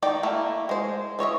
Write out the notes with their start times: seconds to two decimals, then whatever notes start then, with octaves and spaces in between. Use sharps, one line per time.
0.02 D#3 D5 G5
0.23 A3 A#3 E4
0.69 G#3 C5
1.19 E3 C#5 D#5 E5